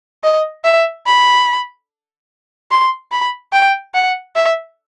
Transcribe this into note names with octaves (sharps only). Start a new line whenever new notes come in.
D#5
E5
B5
C6
B5
G5
F#5
E5